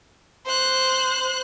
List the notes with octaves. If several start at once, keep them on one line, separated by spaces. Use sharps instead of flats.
C5 F#6